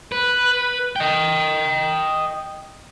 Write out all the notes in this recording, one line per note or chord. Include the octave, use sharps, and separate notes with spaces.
B4
D#5 G5